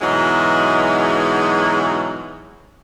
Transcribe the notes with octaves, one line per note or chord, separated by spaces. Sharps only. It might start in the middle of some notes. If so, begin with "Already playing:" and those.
G#2 B2 E3 F#3 G#3